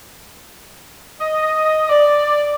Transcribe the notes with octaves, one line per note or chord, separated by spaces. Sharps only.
D#5
D5